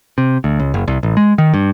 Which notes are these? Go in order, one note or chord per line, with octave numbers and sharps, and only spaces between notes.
C3
D2
C#2
F#1
C2
A1
G#3
D#3
G2